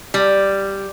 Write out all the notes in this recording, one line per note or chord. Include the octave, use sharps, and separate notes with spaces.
G3